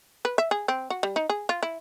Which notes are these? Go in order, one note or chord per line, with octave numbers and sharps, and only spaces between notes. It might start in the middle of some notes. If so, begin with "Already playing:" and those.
B4
E5
G#4
C4
F#4
G3
D#4
G#4
F4
E4